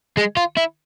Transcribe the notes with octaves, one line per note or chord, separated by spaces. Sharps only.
G#3
F4
E4